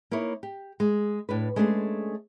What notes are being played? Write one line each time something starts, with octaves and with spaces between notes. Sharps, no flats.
A#3 D#4 E4 C#5
G4
G#3
A2 D4 B4
G#3 A3 C#4 D4 G#4 C5